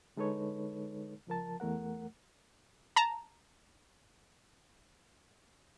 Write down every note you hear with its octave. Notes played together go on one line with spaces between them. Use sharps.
D3 G#3 D#4 A4 B4 C#5
C#2 F3 A#4 A5
E2 A3 A#4 F#5
A5 A#5